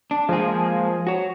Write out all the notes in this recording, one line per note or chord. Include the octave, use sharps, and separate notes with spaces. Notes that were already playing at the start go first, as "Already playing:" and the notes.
D4
F3 G#3 A#3 G#4
F#4 C#5